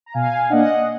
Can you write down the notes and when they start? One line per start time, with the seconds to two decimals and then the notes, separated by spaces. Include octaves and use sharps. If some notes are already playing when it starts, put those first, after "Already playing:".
0.06 A#5
0.14 B2 F5 G#5
0.50 A#3 D4 D#5 F#5